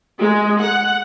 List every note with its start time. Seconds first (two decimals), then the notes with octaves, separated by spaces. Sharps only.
0.20 G#3
0.61 F#5